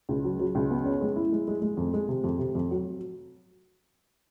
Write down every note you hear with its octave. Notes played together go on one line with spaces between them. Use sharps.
C#2
F#3
F#3
C#2
B3
C#4
G#3
E4
G#3
G#3
G#3
F2
G#3
C3
F2
C3
F2
F#3